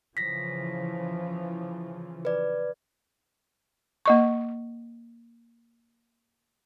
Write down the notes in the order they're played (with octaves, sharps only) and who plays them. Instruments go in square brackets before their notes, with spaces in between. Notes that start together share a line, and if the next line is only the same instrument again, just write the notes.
[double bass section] C#3 E3 F3 [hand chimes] A#6 B6
[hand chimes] B4 D5
[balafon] A#3 D#5 C#6